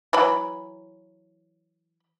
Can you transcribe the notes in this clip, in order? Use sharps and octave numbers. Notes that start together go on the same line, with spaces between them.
E3 F#3 B5